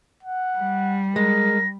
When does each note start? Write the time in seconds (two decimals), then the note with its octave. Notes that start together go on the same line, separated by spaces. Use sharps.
0.23 F#5
0.58 G3
1.16 G#3 A#4 A#6